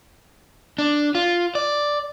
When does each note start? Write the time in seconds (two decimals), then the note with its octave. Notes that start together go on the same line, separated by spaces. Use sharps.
0.78 D4
1.15 F4
1.55 D5